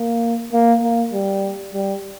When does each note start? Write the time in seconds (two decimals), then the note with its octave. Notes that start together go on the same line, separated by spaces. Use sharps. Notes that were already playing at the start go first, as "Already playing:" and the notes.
Already playing: A#3
0.53 A#3
0.83 A#3
1.13 G3
1.74 G3